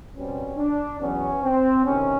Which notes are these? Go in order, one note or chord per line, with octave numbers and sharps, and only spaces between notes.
B2 G3 C4 C#4
D4
E2 B2 F#3 B3 C#4
C4
D2 C3 D#3 C#4